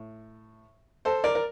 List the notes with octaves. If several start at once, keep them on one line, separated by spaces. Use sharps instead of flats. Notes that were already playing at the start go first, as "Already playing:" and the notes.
Already playing: A2
A4 C5
A#4 D5
A#4